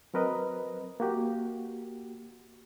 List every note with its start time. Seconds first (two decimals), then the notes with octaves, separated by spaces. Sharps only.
0.14 F#3 C4 A#4 B4 D#5
1.00 A#3 F#4 G4